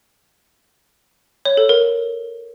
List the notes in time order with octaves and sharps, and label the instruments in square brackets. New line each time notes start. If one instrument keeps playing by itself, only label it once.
[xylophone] C#5
A4
A#4